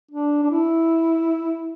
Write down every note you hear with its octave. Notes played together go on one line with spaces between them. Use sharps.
D4
D4
E4